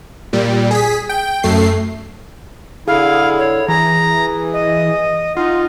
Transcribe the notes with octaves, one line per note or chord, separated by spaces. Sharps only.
A#2 G3
G#4 B6
G5
F#2 A3 C7
D3 E4 G#4 F5
C#5
E3 G#4 A#5
D#5
D#4 F4 F#5